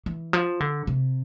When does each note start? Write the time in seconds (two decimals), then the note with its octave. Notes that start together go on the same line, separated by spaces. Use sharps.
0.06 E3
0.33 F3
0.60 D3
0.87 C3